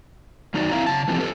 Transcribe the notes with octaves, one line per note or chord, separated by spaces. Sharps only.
F#2 D#3 D#4 F#4 D5
C4 E4 E5 F5 A#5
C#3 A5
E3 F3 C4 G4 A4
F4 G4 A4 B4